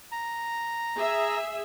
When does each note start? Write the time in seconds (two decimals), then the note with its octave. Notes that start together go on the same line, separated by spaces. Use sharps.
0.12 A#5
0.96 G#4 E5